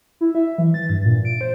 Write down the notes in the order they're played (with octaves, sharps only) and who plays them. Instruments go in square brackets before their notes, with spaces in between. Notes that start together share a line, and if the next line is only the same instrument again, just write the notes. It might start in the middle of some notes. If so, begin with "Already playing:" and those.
[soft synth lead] E4
E5
E3
A6
G2
A#2
D7
C5